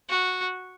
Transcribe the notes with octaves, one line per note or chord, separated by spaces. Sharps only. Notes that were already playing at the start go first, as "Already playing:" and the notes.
F#4